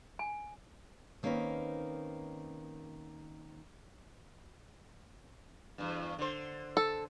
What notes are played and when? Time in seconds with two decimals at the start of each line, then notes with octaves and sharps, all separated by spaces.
0.19 G#5
1.23 D#3 A#3 C4 C#4 D#4 B4
5.78 E2 G2
6.19 D3 C5
6.77 A4